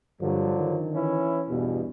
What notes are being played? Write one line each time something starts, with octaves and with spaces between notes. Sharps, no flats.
G2 D3 F3 F#3
D#3
E3 C#4 E4
E2 G2 B2